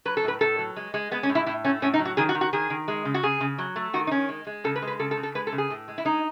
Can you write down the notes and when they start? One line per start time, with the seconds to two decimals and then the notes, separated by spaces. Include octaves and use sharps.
0.05 F#3 B4
0.17 A4
0.24 A2 B4
0.41 A2 A4
0.58 F#3
0.76 G#3
0.94 G#3
1.11 G#3 B3
1.23 C#4
1.29 A2
1.35 E4
1.46 A2 E4
1.64 A3 C#4
1.82 A2 C#4
1.94 D#4
1.99 F#3
2.05 F#4
2.17 D#3 G#4
2.29 F#4
2.35 D#3
2.41 F#4
2.53 D#3 G#4
2.70 D#3
2.88 G#3
3.05 C#3
3.14 F#4
3.23 C#3 G#4
3.41 C#3
3.58 F#3
3.76 A3
3.93 D#3 F#4
4.07 D#4
4.11 D#3 C#4
4.29 G#3
4.47 G#3
4.64 C#3 A4
4.76 B4
4.82 G#3
4.88 B4
4.99 C#3 A4
5.11 A4
5.17 C#3
5.23 A4
5.35 G#3 B4
5.47 A4
5.52 C#3
5.58 G#4
5.70 A2
5.88 G#3
5.98 E4
6.05 G#3 D#4